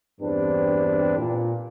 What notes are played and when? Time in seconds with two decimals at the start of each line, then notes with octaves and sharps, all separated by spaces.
0.21 E2 G2 C4 D4 G4 B4
1.17 A#2